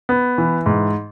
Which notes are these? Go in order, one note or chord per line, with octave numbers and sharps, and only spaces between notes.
B3
E3
G#2